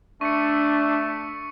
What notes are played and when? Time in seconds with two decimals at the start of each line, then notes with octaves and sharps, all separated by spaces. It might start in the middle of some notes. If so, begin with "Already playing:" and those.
0.21 A3 D4 E5 C#6 C#7